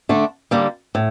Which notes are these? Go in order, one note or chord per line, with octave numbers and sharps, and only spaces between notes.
D3 A3 D4
D3 G3 A#3
A2